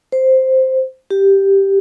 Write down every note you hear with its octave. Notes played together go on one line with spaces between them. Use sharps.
C5
G4